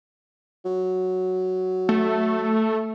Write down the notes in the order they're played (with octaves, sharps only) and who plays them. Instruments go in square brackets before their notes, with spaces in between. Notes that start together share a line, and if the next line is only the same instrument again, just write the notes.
[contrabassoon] F#3
[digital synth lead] A3